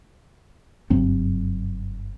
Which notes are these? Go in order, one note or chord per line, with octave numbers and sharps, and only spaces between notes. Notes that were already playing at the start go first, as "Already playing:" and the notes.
F#1 G2 F#3 C4